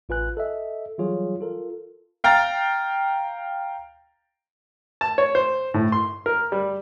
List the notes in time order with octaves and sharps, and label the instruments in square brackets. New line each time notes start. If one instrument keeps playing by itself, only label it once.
[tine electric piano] A1 F4 B4 G#5 F#6
A4 D#5 E5
E3 F#3 G3 F4 G#4 C#5
F4 A4 A#4
[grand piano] F5 G5 A#5 F6 A6
[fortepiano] A5
C#5
C5
A2
C6
A#4
G3